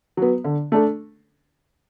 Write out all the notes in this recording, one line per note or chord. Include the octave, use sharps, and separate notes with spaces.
F#3 B3
D3
A3 D4 A4